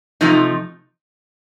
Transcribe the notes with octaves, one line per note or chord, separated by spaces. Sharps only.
C3 F3 A3 D#4